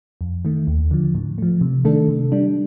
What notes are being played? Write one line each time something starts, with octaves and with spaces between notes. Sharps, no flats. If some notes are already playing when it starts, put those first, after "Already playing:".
F2
D#3 A3
D#2
D3 F3
A2
F3 A3
C3
D#3 A3 D4 A4
C3
G3 D4